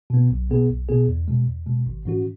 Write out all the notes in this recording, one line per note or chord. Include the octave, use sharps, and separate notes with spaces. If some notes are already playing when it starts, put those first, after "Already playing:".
B2 B3
B1
B2 B3 G#4
B1
B2 B3 G#4
E2
B2 G#3
E2
B2 G#3
G#1
G#2 E3 C#4 F#4